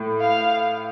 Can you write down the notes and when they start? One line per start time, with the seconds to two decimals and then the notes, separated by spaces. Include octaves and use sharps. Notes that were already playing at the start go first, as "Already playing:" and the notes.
Already playing: A2
0.20 F5